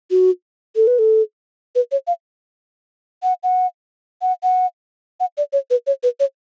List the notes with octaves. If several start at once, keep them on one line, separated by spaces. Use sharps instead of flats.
F#4
A4
B4
A4
B4
C#5
F5
F#5
F#5
F#5
F#5
F#5
D5
C#5
B4
C#5
B4
C#5